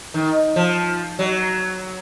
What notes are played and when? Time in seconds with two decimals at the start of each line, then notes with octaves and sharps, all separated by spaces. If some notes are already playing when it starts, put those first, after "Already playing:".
0.14 D#3
0.56 F3
1.19 F#3